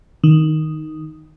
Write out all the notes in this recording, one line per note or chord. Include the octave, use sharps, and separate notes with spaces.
D#3